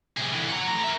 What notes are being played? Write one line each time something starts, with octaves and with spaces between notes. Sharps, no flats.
C3 G#4
D3 E3
F#4 A#5
A2 A#5
A#4 E5